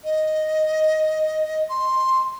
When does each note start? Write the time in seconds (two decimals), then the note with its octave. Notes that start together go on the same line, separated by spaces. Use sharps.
0.04 D#5
1.69 C6